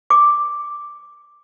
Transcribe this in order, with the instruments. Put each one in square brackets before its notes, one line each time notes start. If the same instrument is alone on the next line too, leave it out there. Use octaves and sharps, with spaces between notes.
[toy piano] D6